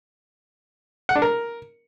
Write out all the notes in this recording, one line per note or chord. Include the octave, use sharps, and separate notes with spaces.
F#5
D4
A#4